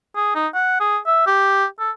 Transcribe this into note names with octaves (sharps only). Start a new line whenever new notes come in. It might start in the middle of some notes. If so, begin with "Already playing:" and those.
G#4
D#4
F#5
G#4
E5
G4
A4